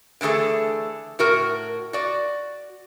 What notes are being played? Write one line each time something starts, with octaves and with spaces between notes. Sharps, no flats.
D3 E3 A3 G#4 A4
A2 F#4 A#4
F#4 D5